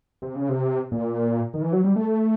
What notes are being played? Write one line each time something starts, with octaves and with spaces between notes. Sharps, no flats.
C3
C#3
C3
A#2
D#3
E3
F#3
G3
A3